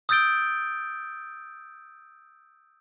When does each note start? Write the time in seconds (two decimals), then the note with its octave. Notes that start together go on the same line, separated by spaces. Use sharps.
0.09 D#6 E6 G6 A6 D7 G7